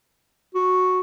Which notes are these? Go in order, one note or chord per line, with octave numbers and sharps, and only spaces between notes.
F#4